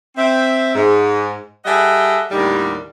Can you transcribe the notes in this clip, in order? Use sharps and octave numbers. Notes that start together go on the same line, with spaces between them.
C4 E5
G#2
G3 G#4 A4 D#5 E5 F#5
D#2 A2 D3 D#3 G3